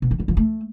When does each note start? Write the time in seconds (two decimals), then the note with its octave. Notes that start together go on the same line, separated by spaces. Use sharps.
0.02 B2
0.11 E3
0.19 G3
0.28 F3
0.37 A3